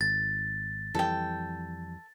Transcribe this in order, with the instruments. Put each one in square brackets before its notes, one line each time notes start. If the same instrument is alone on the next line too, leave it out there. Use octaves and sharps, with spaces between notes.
[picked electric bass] G#1 [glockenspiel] A6
[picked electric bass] F2 E3 G3 [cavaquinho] A4 G5